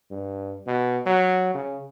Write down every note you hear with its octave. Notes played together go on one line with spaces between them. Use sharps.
G2
B2
F#3
C#3